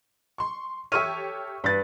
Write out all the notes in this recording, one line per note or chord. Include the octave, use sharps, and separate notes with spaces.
C6 C#6
G4 A4 C#5 E5 C#6 F6 D#7
G2 B4 A6